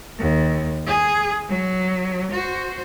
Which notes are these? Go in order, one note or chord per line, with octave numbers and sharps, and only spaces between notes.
D#2
G#4
F#3
F#4 C5